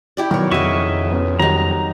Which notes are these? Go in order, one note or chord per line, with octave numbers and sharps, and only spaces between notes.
E4 G4 D5
B2 D#3 F#3 A#4 C#5
F2 C#3 F#4 D#5 E5 C#6
B3 C#4
D#3 F#3 G3 D#4 A#5